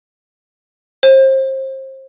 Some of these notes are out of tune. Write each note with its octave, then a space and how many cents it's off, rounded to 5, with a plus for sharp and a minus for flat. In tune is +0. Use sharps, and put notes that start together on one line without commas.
C5 +30